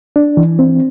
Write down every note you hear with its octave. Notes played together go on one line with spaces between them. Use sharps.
D4
E3
C4